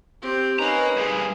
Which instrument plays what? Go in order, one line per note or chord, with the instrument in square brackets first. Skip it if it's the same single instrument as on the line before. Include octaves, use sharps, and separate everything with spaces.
[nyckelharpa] C4 G4
[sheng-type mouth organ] C#4 D#4 [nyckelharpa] B4 [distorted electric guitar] F5 A#5
[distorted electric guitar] G2 A#2 [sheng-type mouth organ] G#4